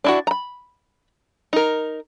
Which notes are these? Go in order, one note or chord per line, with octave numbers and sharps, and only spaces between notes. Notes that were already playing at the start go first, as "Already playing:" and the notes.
D4 E4 F#4
A#5 B5
D#4 A#4